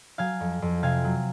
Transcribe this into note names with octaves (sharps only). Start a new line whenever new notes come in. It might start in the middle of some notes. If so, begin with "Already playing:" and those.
F#3 F5 G#5
F2
F2
C3 F5 G#5
F#3